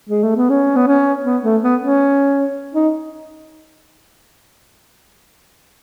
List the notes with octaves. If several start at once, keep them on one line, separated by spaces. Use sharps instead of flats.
G#3
A3
B3
C#4
B3
C#4
B3
A3
B3
C#4
D#4